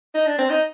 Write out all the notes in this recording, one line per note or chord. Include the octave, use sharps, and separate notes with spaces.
D#4
D4
C4
D#4